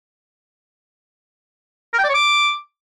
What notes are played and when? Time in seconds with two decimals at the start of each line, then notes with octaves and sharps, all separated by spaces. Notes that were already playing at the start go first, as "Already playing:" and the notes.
1.93 A#4
1.99 G5
2.04 D5
2.09 C#5
2.14 D6